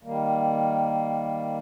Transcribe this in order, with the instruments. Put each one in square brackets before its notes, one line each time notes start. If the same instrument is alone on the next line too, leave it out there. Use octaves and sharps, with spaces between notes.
[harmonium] D#3 G3 A#3